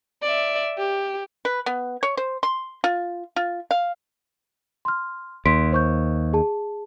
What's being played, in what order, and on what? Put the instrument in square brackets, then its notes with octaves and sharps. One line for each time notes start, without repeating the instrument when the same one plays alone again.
[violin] D5 E5
G4
[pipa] B4
B3
C#5
C5
C6
F4
F4
F5
[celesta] C6 F6
[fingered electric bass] D#2 [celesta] C6 B6 D7
[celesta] C5 C#6 G6
G#4 A5